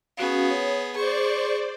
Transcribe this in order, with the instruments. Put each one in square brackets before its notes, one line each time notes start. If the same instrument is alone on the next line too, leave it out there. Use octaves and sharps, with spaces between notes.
[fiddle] B3 G#4 [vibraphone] C#4 F#4 F5
[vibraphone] C#5
[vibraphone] G#4 [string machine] C5 D5 [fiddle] C#6